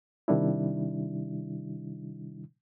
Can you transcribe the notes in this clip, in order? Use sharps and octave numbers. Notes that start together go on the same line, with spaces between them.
C3 D#3 G3 D4 E4